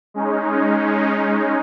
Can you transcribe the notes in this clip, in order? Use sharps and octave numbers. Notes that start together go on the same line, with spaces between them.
G#3 C#4 D#4